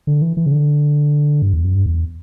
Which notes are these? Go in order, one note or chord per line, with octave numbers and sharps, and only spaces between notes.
D3
E3
E3
C#3
D3
G2
E2
F#2
G2
E2